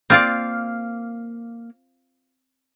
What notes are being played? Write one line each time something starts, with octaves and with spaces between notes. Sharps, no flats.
A#3 C4 F4 D5 F5